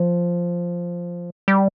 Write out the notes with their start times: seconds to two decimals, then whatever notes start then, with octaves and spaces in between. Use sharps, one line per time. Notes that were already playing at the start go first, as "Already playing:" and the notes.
Already playing: F3
1.48 G3